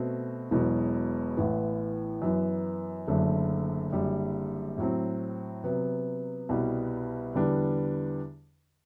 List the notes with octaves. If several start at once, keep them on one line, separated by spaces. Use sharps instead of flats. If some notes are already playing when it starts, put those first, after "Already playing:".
Already playing: B2 A3 C4 F#4
E1 E2 B2 F#3 B3
A1 A2 E3 B3
F#2 E3 B3
F#1 F#2 D3 A3
F#1 F#2 D3 G3
A2 F#3 C4
C3 F#3 B3
C2 B2 G3 B3
E2 D3 G3 B3 D4